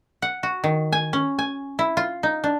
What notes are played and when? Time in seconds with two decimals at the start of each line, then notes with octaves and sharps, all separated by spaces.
0.22 F#5
0.43 F#4
0.64 D#3
0.92 G#5
1.13 C#4
1.39 G#5
1.79 E4
1.97 F4
2.23 D#4
2.44 D4